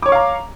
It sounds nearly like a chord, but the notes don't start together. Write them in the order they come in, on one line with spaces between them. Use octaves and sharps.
D6 C#5 C#6 F5 A#5